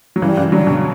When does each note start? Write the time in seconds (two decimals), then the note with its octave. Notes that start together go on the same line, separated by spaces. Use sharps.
0.16 F#3
0.22 C#3 E3 G3
0.37 C#3 E3
0.52 D3 F#3 G3
0.67 B2 D3